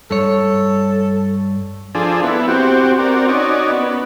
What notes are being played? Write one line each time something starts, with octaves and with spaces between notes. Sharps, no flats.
G2 A4 C#5
F3 D4 G#4 A4
B3 E4
C4 F#4 G4
C4 F#4 A#4 D5
C#4 D#4 F#4 D5
B3